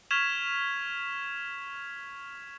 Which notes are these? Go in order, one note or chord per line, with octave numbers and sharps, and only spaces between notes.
C#6 F6 G#6 B6 E7 F7